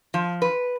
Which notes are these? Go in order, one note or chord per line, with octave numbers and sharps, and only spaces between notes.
F3
B4